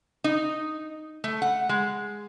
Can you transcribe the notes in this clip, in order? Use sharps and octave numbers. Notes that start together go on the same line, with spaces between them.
D#4
A3
F#5
G#3